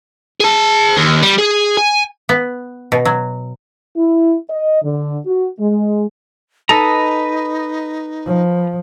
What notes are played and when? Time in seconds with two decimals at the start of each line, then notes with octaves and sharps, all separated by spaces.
0.40 G#4 A5
0.97 D#2
1.22 G3
1.38 G#4
1.77 G#5
2.29 B3
2.92 B2
3.05 F#3
3.97 E4
4.50 D#5
4.83 D3
5.26 F#4
5.60 G#3
6.69 D#4 A4 B4 D#5 A#5
8.26 F3